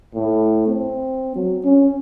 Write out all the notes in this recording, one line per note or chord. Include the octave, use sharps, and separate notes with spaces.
A2
C4
F#3
C#4